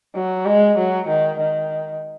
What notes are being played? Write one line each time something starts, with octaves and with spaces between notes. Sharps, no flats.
F#3
G#3
F#3
D#3
D#3